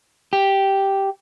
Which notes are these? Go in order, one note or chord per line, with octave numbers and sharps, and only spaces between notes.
G4